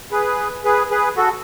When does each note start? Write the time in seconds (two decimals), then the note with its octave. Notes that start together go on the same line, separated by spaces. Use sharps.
0.11 G#4 B4
0.64 G#4 B4
0.90 G#4 B4
1.16 F#4 A4